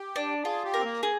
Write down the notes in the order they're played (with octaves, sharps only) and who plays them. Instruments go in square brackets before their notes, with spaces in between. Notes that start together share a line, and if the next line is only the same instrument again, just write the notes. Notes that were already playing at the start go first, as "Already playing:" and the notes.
Already playing: [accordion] G4
[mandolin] D4
[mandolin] F4 [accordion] G#4
[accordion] G4
[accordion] C4 [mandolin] A#4
[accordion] A#3
[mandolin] G#4